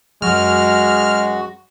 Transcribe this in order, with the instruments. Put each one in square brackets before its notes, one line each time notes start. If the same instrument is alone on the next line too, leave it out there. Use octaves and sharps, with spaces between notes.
[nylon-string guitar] F#2 F#3 [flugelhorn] G#3 [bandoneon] F#4 [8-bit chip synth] F6